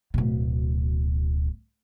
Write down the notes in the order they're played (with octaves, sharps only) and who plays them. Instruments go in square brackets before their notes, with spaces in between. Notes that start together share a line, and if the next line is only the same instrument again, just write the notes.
[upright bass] D1 B2